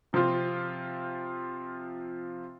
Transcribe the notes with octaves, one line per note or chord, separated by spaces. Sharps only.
C3 F3 C4 F4